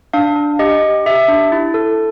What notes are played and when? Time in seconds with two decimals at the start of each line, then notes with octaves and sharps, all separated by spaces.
0.13 D4 F5
0.36 D4
0.59 G4 D#5
0.82 G4
1.06 G4 E5
1.28 D4
1.52 E4
1.74 A4